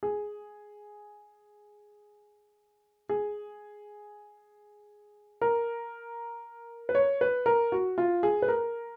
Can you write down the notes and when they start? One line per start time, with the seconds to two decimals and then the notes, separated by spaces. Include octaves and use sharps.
0.03 G#4
3.09 G#4
5.42 A#4
6.89 B4
6.95 C#5
7.21 B4
7.46 A#4
7.72 F#4
7.98 F4
8.23 G#4
8.42 B4
8.48 A#4